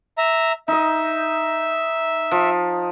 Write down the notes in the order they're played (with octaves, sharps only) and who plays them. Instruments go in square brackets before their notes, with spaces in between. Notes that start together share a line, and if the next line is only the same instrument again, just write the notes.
[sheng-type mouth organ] E5 A#5
[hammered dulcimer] D#4 D#5 [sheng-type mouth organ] E5
[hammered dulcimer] F3